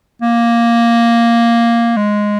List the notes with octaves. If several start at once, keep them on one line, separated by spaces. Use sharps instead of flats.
A#3
G#3